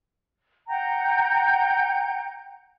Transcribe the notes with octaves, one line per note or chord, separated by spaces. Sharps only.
F#5 G5 A#5 G6